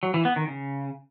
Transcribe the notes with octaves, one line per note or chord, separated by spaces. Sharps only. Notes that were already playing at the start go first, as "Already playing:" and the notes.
F#3
E3
B3
D#3
C#3